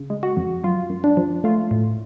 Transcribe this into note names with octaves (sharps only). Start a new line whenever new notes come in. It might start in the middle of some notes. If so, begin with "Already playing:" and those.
Already playing: C#3
G#3
F#4
F2
F#2 F4
F#2
D4
F3
A3 F4
A2